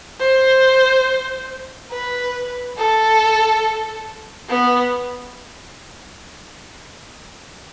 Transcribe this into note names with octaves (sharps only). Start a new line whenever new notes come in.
C5
B4
A4
B3